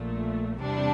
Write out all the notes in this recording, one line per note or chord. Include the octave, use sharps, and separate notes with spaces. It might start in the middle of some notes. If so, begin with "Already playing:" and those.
Already playing: A#1 A#2 A3
E2 C3 G3 D4